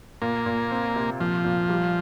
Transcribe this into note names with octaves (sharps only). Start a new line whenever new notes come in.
A#2 A#3
A#2
C4
C3
A#2 F3
A#2
G3